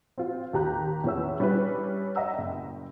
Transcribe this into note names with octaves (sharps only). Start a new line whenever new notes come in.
C4 F4
D#2 G4 A#5 F#6 G6
E2 E3 C#4 E5 E6
G3 C#4 D4 E4 B4
D#5 E5 F#5 A#5 E6
F#1 G5